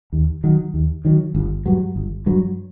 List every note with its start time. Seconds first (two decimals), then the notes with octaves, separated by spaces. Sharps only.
0.12 D#2
0.44 D#3 F#3
0.74 D#2
1.05 D#3 F#3
1.35 G1
1.66 G2 F#3
1.96 G1
2.26 G2 F#3